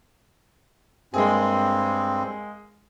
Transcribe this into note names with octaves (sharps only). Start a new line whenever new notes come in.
G2 G#3 A#3 C4 G#4